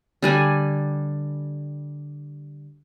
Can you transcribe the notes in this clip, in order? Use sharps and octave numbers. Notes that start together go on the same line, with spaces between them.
D3 G3 G#5